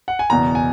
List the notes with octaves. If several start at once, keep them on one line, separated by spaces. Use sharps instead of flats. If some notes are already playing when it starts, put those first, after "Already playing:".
F#5
G#5
F#1 E2 B2 A#5
G#5